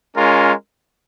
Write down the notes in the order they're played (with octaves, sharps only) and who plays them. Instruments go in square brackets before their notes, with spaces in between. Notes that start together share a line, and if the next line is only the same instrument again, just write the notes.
[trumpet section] G#3 C#4 F4 A#4